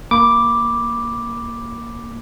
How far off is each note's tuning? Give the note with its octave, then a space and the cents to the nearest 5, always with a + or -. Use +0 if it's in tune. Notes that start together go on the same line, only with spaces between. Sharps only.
A#3 +0 B5 -5 D6 +0